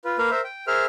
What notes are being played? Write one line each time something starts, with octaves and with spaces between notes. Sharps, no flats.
F4 B4
A#3 A#4 B4 F5
A#4 C5 E5
G5
G#4 A#4 C5 E5 F6